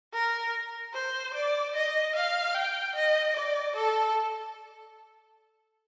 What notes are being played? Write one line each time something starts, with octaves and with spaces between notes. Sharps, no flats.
A#4
C5
D5
D#5
F5
G5
D#5
D5
A4